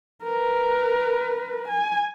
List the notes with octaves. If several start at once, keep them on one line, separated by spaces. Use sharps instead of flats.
A#4 B4
G#5